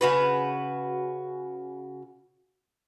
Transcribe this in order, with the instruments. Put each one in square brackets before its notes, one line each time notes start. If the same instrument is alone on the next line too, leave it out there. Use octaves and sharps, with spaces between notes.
[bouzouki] C#3 F#4 B4